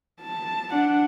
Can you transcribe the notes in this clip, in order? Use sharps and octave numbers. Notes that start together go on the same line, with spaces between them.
A5
D4 F#5